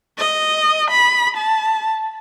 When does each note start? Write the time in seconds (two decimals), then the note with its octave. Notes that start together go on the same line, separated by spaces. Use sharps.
0.18 D#5
0.91 B5
1.37 A5